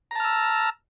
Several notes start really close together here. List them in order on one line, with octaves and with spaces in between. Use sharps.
A#5 A5 F6 E6